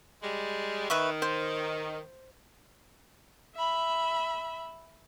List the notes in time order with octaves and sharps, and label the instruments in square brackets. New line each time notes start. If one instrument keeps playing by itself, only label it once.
[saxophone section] G3 G#3
[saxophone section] D#3 [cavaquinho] B4 E5 C#6
[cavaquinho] C5
[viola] E5 B5